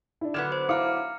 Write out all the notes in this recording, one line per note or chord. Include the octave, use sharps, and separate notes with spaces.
D4 E4
D3 F#3 B3 F6 G#6 E7
C5
E4 F5 A#5 D6 F6 C#7